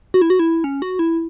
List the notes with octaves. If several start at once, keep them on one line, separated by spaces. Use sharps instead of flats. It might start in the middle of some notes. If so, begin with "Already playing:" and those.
F#4
E4
F#4
E4
C#4
F#4
E4